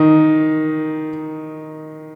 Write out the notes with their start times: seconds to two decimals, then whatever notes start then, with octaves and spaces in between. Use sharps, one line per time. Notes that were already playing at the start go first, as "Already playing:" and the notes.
Already playing: D#3 D#4